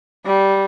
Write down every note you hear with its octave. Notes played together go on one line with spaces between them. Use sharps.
G3